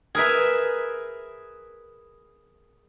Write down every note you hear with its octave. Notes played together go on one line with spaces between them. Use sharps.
G#4 A#4 B4 E5